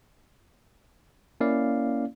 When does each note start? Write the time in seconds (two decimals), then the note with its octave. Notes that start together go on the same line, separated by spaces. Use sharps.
1.40 A#3 C#4 E4 D5 F5